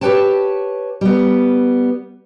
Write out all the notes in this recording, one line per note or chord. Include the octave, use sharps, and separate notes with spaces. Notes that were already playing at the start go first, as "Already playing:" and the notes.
G4 G#4 B4 C#5 G5 A5
G3 B3